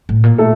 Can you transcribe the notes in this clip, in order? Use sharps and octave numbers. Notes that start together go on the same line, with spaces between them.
A2
A#2
A3 A4